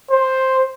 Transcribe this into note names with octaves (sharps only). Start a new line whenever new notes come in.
C5